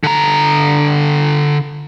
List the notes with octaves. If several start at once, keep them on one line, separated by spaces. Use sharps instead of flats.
D3 A#5